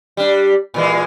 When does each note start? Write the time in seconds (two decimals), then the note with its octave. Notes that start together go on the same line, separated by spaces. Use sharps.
0.17 G3 D4
0.74 A#2 E3 G#3